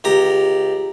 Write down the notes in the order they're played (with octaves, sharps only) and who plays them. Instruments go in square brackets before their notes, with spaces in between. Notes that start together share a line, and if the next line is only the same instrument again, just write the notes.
[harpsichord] C#2 G4 A#5